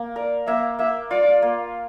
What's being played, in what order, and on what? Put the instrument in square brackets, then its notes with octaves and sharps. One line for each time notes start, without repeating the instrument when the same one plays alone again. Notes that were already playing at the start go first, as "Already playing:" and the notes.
Already playing: [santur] A#3
[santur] A#4 [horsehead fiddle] D5
[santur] A#3 [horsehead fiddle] E5
[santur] A#3 [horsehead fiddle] E5
[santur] F4 [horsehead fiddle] D5
[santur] A#3